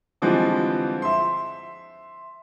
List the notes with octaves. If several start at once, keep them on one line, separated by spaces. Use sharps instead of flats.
D3 E3 F3 G3 G#3 C4
E5 C6